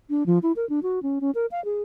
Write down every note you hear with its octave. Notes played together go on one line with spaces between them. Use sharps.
D4
F3
E4
A#4
D4
F#4
C#4
C#4
A#4
F5
G#4